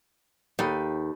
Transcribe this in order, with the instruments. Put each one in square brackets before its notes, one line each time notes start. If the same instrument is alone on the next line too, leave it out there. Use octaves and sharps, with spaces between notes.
[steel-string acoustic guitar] D#2 [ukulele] D#4 A4 B5